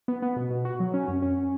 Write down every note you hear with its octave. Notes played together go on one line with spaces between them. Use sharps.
B3
B3
B2
B2
F#4
F#3
C#4
F#2
C#4